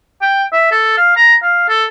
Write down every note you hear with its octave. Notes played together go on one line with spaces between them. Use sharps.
G5
E5
A4
F5
A#5
F5
A4